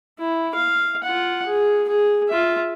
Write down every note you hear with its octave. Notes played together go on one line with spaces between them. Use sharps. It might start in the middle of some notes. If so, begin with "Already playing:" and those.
E4
F5
F4 F#5
G#4
G#4
F4 E5